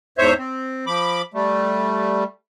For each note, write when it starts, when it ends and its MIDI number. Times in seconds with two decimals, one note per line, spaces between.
0.18 0.34 40
0.18 0.34 44
0.18 0.34 72
0.18 0.34 73
0.18 0.34 76
0.38 0.85 60
0.87 1.22 53
0.87 1.22 83
0.87 1.22 86
1.34 2.24 55
1.34 2.24 57